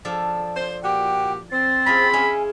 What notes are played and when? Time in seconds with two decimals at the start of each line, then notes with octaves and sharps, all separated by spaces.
0.05 F3 D4 A4
0.55 C5
0.84 A#2 F#4 G4 G5
1.51 C4 A6
1.86 C#4 F4 G#4 B5
2.13 C#4 E4 G#4 G#5